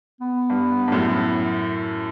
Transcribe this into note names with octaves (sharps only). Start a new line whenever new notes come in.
B3
G2
G2
F#2 A2